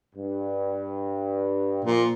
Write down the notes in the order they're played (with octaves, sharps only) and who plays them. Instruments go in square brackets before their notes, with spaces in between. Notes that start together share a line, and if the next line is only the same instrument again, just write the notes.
[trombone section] G2
[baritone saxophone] A#2 [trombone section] F3